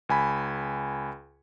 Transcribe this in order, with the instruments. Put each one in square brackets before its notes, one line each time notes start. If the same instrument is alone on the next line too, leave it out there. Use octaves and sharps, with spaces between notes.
[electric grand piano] C#2 G#5 B5